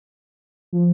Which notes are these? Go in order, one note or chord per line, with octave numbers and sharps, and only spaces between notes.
F3